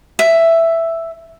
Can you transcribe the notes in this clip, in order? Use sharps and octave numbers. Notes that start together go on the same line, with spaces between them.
E5